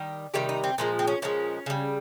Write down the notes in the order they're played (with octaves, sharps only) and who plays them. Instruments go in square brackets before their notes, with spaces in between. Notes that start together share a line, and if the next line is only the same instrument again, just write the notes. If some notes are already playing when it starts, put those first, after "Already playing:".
Already playing: [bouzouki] D#3 G3
C3 D#3 G3 G4
D#4
C4
A#2 F3 G#3 A#3
C4
C#4
A#2 F3 G#3 C#4
C#3 G3